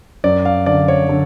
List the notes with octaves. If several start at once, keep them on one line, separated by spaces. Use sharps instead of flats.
F#2 D5
F5
D3 D5
C#5
D3